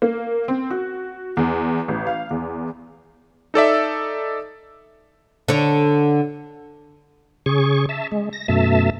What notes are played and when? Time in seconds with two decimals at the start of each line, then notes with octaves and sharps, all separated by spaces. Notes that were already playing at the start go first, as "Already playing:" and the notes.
0.02 A#3
0.48 C4
0.70 F#4
1.37 E2
1.88 A1
2.07 F5
2.31 E2
3.54 D#4 A4 D5 E5
5.48 D3 C#5
7.46 C#3 G#4 C#6
7.89 E5 A5
8.12 G#3
8.33 A#6
8.48 F#2 B2 A3 E5 A5